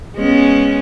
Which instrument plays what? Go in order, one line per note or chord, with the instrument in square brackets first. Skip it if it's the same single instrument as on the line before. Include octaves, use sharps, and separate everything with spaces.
[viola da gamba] G#3 B3 C#4